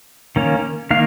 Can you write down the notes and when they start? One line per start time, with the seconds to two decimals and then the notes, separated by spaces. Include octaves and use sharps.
0.36 D#3 A#3 C#4
0.91 D#3 A#3 F5